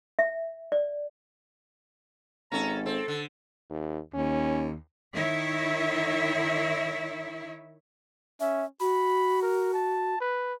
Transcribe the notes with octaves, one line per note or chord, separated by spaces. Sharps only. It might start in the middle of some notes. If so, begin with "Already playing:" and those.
E5
D5
G#1 C#4 A4 A#5
C4 A4
D3
D#2
D#2 C#4
D#3 D#4 E4 C#5 E5
C#4 E5
F#4 B5
A#4
A5
B4